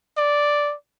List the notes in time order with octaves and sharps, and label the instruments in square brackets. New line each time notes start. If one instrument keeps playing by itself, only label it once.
[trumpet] D5